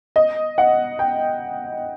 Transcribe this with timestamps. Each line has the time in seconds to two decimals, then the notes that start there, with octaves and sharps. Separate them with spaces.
0.16 D#5
0.58 F#5
0.99 G5